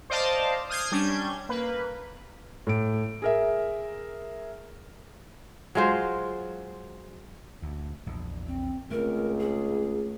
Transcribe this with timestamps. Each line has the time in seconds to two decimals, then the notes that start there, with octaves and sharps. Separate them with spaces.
0.10 C5 D5 D#5 F5 A5
0.69 D#6 F6 G6 G#6 C7
0.92 G3 C#4 D4 G6 G#6
1.49 A#3 B4
2.67 A2 D7
3.22 G#4 A#4 E5
5.75 F#3 G#3 F4 C5
7.62 D2
8.06 A#1 E2
8.47 C4
8.91 C#2 A3 B3 C4 A#4
9.40 G#4